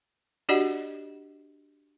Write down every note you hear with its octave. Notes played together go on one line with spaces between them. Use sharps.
D4 F#4 G4 D5 D#5 F#5